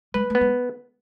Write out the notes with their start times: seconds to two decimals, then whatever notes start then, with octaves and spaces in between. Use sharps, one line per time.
0.14 G#3 B4
0.30 A3 B3
0.41 G#3